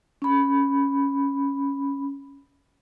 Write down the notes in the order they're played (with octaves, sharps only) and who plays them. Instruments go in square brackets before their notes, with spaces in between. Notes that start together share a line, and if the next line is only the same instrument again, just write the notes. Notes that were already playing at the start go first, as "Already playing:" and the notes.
[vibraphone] C#4 B5